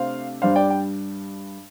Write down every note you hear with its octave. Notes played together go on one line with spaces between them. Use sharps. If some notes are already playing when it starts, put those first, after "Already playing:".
Already playing: C3 A3 D4 C5 F5
G2 G3 D4 C5 F5
D5 G5
G5